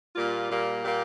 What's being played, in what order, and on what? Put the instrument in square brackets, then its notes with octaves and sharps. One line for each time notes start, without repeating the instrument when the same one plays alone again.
[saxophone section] A#2 G3 A#3 F4
A#2 G3 A#3
A#2 G3 A#3 G4